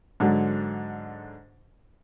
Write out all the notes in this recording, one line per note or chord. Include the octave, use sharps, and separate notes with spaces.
G#2 D3 F#3